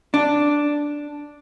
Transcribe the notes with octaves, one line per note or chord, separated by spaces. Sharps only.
D4